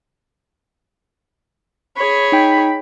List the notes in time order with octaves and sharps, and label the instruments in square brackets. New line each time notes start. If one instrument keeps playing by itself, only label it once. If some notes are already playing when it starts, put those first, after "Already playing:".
[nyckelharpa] G#4 C#5 [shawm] B5
[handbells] D#4 G5